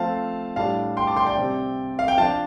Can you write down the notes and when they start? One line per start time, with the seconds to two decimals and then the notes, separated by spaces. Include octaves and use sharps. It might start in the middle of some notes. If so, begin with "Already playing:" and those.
Already playing: F3 A3 C4 F5 A5
0.56 A2 G3 D4 F5 A5
0.97 G5 C6
1.07 A5 D6
1.16 G5 C6
1.27 D5 G5
1.37 C3 G3 C4
1.99 F5
2.08 G5
2.18 F3 D4 F5 A5